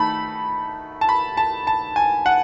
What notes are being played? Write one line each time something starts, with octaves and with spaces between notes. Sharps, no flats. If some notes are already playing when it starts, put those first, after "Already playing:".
Already playing: D#3 A3 D#4 A5 B5
A5
B5
A5
A5
G#5
F#5